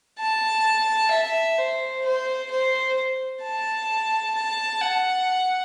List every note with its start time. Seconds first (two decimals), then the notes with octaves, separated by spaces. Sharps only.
0.20 A5
1.11 E5
1.58 C5
2.05 C5
2.51 C5
3.43 A5
4.35 A5
4.82 F#5